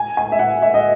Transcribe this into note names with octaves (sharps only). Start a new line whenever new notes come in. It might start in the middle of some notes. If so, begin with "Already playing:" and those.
Already playing: G#5
G#5
E5
F#5
E5
D#5